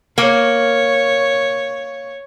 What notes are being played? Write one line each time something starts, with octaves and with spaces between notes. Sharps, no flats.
A#3 C#5